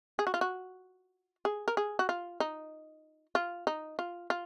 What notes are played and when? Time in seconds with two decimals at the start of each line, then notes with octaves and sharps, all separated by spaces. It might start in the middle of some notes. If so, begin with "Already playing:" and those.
0.19 G#4
0.27 F#4
0.34 F4
0.41 F#4
1.45 G#4
1.68 A#4
1.77 G#4
1.99 F#4
2.09 F4
2.40 D#4
3.35 F4
3.67 D#4
3.99 F4
4.30 F4